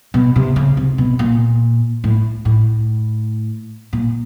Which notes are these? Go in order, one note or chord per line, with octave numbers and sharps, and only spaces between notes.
B2
C3
C#3
C3
B2
A#2
A2
A2
A#2